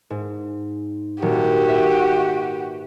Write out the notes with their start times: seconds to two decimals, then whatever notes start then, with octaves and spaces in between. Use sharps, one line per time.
0.10 G#2
1.22 D#1 F#4 G4
1.68 B4 E5